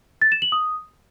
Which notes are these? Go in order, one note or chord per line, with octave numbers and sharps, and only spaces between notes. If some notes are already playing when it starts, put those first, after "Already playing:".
A6
E7
F#7
D#6